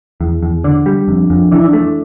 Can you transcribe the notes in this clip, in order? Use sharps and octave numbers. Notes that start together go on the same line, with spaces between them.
E2
E2
D3 D4
G3
F2
F2
E3 D4
E4
D4
A3